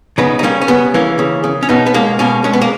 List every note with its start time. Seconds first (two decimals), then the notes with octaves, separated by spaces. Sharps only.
0.18 C#3 B3 D#4
0.39 D#4
0.43 G3 A#3 C#4
0.62 C#4
0.68 C#3 B3
0.94 E3 A#3 C#4
1.19 C#3
1.44 C#3
1.63 C#4
1.69 B2 B3 D#4
1.86 B3
1.94 G#3 A#3 C#4
2.19 B2 A#3 C#4
2.44 G#3 C#4
2.53 B3
2.61 A#3